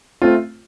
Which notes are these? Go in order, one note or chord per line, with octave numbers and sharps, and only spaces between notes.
A3 C4 F4